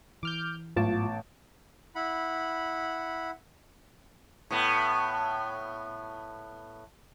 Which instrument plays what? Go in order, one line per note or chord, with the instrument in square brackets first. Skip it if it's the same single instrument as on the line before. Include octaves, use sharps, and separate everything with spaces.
[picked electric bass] E3 [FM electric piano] D6 F6 G6
[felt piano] A1 [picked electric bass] G#2 F#3 [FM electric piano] B3 A5 D6 [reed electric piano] F4
[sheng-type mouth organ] E4 F#5 B5
[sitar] A2 B3